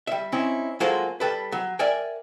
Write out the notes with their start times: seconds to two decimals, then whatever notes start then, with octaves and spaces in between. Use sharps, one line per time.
0.07 G3 E5
0.32 C4 C#4 D#4 E4
0.80 F#3 G#3 A#3 F4 A4 C5
1.20 G3 A4 B4
1.52 F#3
1.79 A#4 D5 E5 G5 G#5